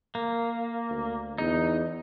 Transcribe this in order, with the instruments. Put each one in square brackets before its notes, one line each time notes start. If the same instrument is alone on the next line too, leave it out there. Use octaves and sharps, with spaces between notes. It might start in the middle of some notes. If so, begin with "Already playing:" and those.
[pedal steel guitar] A#3
[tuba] D2
[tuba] E2 [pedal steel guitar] D#4